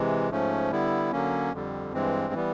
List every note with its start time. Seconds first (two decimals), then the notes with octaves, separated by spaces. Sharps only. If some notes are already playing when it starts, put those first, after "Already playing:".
Already playing: C3 E3 G#3
0.30 G#2 F3 A3 C#4
0.71 D3 G3 B3 E4
1.12 D3 F#3 A#3 C#4
1.53 F2 D3 G3
1.93 G2 E3 G#3 C4
2.33 E3 G3 B3